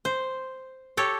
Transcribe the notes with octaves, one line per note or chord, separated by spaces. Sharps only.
C5
G4 A4 C#5